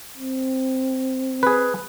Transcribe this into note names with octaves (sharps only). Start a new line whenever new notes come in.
C4
G#4 B4